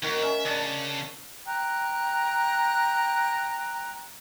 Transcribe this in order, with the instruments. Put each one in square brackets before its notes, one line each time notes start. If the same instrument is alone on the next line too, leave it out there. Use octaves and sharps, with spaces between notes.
[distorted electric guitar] D#2 [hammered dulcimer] D#3 F#4 A#4
[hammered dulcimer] C#4 [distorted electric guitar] E5
[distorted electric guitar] C#3 [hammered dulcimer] D4 A5
[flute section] G5 A#5 F#6